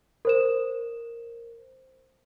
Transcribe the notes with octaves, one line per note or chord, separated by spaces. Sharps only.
A#4 C5 E7